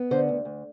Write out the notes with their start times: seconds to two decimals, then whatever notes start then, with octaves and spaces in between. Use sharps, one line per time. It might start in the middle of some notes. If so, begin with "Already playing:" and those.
Already playing: B3
0.11 D3 C5
0.29 D2
0.45 D2